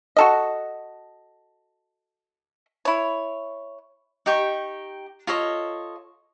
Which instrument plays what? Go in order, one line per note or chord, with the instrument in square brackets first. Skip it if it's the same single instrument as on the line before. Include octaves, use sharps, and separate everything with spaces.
[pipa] F#4 A4 D#5
E4 C#5
[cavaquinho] D#4 G4 G5 C#6
F4 A4 C#5 D#5